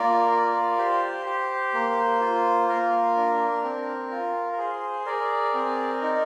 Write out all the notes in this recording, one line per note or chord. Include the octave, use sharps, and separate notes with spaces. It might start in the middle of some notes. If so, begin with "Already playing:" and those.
Already playing: A#3 F4 A#4 D5
F4
G4 C5
G4
A#3
F4
A#3 A#4
D4
C4
F4
A#4
G#4 C5
G#4 A#4 D5
C4
D#4